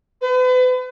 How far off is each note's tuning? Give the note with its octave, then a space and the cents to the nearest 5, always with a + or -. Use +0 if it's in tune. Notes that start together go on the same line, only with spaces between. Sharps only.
B4 +40